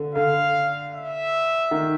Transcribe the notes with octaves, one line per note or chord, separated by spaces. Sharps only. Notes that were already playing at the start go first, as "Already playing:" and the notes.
Already playing: D3
D3 F5
E5
D#3